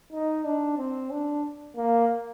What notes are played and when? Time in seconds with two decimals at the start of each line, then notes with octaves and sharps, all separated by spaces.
0.12 D#4
0.44 D4
0.78 C4
1.11 D4
1.76 A#3